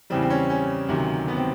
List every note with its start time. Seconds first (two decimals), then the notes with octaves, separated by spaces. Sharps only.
0.10 E2 C#3 E3 G3 C4
0.22 C4
0.30 C#4
0.50 C#4
0.89 D2 C3 D#3 F#3
1.28 B3
1.37 C4